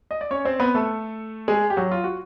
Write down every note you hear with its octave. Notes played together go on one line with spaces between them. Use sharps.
D#5
D5
C#4 C#5
C4 C5
B3 B4
A3 A4
G#3 G#4
G4
F#3 F#4
F4
F#4